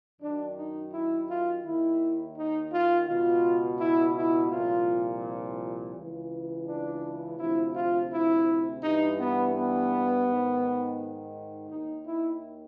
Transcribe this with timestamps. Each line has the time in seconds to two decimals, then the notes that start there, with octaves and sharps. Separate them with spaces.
0.20 F#2 D#3 D4
0.56 D#4
0.92 E4
1.28 F4
1.64 D#2 D#3 E4
2.36 D#4
2.72 F4
3.07 C#2 B2 F4
3.79 E4
4.15 E4
4.50 C2 A#2 F3 F4
5.95 C#2 C#3 E3
6.66 D4
7.38 D2 C3 F3 E4
7.74 F4
8.10 E4
8.82 G2 E3 D#4
9.17 B3
9.53 B3
10.25 G#2 D#3
11.69 D#2 D#3 D#4
12.05 E4